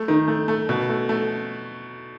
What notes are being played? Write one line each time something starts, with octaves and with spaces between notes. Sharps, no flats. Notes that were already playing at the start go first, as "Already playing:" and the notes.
Already playing: A3
D#3
A3
A3
B2
A3
A3